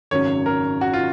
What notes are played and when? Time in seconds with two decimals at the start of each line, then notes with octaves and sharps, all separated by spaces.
0.11 G#1 F#2 C#3 F#3 C#5
0.46 A#4
0.81 F#4
0.94 F4